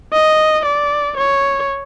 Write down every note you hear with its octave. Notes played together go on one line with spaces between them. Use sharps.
D#5
D5
C#5